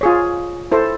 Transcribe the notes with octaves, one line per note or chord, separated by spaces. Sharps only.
F4 G#4 C#5
E4 A4 C5